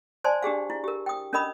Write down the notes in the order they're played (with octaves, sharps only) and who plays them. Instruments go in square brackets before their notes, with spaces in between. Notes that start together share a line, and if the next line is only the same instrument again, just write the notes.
[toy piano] C5 D5 G#5 A5 C6
D4 G4 G#4 F5
E4
G4 A#4
G5 D#6
C#4 D4 A#4 D#5 B5 D#6